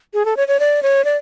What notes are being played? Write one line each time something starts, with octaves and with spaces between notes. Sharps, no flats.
G#4
A4
C#5
C#5
D5
C#5
D5